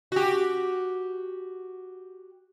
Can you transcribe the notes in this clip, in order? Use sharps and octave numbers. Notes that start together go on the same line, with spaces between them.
F#4 G4